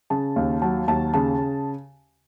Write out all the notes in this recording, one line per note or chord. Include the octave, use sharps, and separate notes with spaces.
C#3 A5
D#2
F#3 A5
D#2 A5
C#3 A5